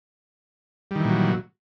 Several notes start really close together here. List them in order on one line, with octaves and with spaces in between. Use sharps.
G3 D#3 E3 A#2 F#3